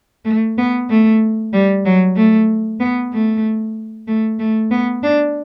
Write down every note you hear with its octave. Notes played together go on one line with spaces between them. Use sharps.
A3
B3
A3
G3
F#3
A3
B3
A3
A3
A3
B3
D4